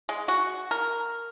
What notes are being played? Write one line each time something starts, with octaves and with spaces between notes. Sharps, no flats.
G#3
F#4
A#4